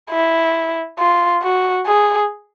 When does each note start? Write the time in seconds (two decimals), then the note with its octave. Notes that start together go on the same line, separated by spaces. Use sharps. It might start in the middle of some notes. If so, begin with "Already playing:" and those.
0.11 E4
0.99 F4
1.43 F#4
1.87 G#4